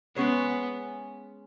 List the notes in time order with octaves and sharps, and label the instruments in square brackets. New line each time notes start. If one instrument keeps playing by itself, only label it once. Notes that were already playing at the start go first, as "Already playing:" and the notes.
[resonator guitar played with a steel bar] G#3 C#4 G#4 C#5 [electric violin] B3